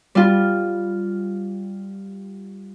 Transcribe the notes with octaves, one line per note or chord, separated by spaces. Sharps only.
G3 F4